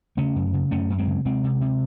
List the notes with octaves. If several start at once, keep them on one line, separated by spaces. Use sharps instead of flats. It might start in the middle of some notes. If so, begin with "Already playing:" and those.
C#3 A3 C#4
F#2
C#3
F#2 A3 C#4
F#2
G#3 C4
C#3
C3 G#3 C4
C3
C3